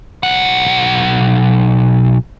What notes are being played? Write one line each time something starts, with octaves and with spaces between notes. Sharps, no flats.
B1 F#5